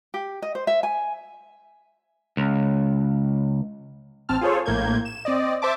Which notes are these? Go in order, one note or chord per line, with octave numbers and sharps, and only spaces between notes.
G4
D#5
C5
E5
G#5
C#2
A1 C4 A5 F6
F4 G#4 A4 C5 C#5
A#1 A2 A#3 G6 G#6
E7
C4 D5 D#5
C5 E5 A5 D6